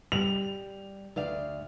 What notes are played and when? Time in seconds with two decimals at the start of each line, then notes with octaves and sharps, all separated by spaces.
0.12 G3 F7
1.16 D2 D5 F5